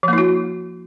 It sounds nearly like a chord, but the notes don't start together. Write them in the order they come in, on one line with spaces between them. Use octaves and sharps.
F3 A#3 E4 F#4